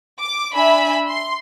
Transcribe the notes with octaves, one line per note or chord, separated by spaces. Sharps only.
D6
D4 E5 G#5 B5
C6